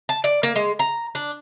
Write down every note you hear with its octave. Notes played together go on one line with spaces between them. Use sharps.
A5
D5
A#3
G#3
A#5
D4